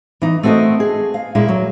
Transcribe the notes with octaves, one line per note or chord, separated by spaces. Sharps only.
E3 D#4
A3 C4 F#4 G#4 A#4 D#5
G#4
F5
A#2 G#3 A#3 E4
F#3